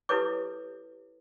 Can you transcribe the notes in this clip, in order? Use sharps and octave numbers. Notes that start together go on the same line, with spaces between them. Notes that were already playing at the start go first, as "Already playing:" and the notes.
E4 G4 A4 B4 C#5 D6